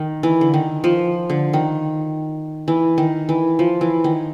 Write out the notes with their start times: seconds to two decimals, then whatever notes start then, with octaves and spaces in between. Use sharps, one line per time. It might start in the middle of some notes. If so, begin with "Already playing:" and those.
Already playing: D#3
0.23 E3
0.41 D3
0.54 D#3
0.84 F3
1.30 D3
1.53 D#3
2.68 E3
2.98 D#3
3.29 E3
3.59 F3
3.81 E3
4.04 D#3